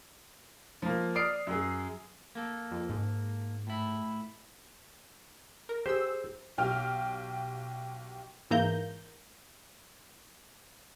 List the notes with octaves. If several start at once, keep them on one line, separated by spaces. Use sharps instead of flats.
F3 A#3
D5 D#6 F6 C7 D7
F#2 G#4
A#3 A4
F2
G#2
A2 E4
A#4
G4 G#4 C5 E6
B1 G4 F6
G#2 E3 A#3 A#5 G6